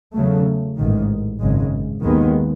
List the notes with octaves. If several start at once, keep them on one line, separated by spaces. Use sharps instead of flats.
E2 C#3 F#3 A3
A1 G#2 D#3
G#1 F#2 C#3 G#3
D#2 D#3 G#3 B3